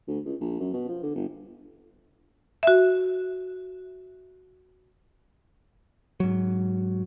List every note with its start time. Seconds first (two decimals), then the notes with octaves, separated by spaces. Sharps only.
0.08 D2
0.25 C#2
0.40 A#1
0.60 F#2
0.74 B2
0.88 F3
1.03 D3
1.15 G1
2.63 F#4 E5
6.20 G#2 F#3